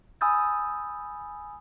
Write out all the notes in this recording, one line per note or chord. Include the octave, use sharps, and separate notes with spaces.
G#5 B5 D#6 E6 G6 A6